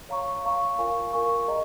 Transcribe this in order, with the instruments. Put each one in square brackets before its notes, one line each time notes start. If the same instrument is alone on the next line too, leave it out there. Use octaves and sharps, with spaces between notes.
[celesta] C#5 F5 A#5 C#6
C#5 F5 A#5 C#6
F4 A#4 F5 G#5 C#6
F4 A#4 F5 G#5 C#6
G#4 D#5 A#5